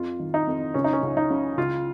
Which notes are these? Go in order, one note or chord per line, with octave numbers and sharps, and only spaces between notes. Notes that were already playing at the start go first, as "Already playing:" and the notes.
Already playing: F2 F4
D#3
D#4
F2
C#2 C#4
D#4
C#4
C#2
D#4
C#3
C#2 F4